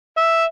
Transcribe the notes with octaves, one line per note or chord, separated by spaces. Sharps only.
E5